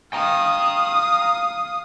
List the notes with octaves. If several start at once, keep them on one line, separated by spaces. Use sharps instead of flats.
F5 G5 A#5 D#6